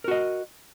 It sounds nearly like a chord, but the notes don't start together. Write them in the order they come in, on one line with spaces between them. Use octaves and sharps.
A#4 F#4 D#5